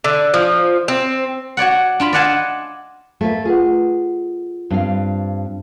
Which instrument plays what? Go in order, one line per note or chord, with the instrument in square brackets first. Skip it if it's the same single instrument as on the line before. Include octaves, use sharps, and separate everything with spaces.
[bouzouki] D3
F3
C4
[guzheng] F#4 C#5 D5 F#5
D4 F4 B5
D5 D#5 F5 F#5 G#5 A5
[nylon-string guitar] A3 A#3 B4
[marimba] F4 B4 F#5 [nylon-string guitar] G#4
[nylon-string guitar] G2 C4 F5